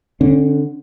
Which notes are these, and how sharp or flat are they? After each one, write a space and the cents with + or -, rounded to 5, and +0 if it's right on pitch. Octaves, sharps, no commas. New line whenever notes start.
D3 +0 C#4 -35